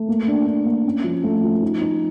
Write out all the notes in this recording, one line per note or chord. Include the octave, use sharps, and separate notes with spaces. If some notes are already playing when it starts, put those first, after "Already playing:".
Already playing: A3
A#3
D4
D4
A#3
C#4
F3
A3
F3
D#4
D#4